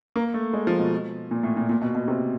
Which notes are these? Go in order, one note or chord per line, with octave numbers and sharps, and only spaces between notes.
A#3
A3
G#3
F3
B2
A#2
A2
A#2
A#2
B2
B2
C3